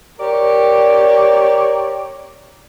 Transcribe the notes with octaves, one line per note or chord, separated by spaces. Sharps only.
G4 A#4 C#5 D5